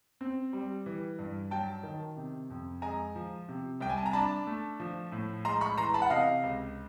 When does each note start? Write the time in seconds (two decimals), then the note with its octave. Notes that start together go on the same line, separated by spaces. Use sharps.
0.21 C4
0.53 G3
0.86 E3
1.19 G2
1.51 F#3 G5 A5
1.83 D#3
2.17 C3
2.50 F2
2.82 G#3 G#5 A#5
3.15 F3
3.49 C3
3.81 C2 G5
3.89 G#5
3.98 A5
4.06 A#5
4.13 D4 A5 B5
4.47 A3
4.80 F3
5.12 A2
5.45 G#3 A#5 C6
5.61 B5 C#6
5.78 E3 A#5 C6
5.94 A5 B5
6.02 F#5
6.10 C3 D#5 F5
6.43 C#2